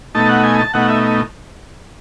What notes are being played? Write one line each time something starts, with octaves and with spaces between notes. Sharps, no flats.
B2 A3 D#4 A5
F#5
G#5
A5
B2 A3 D#4 F#5
E5